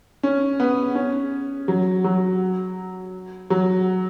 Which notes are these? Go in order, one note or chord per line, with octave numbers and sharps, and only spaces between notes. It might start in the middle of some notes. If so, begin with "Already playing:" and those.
C#4
B3
C#4
F#3
F#3
F#3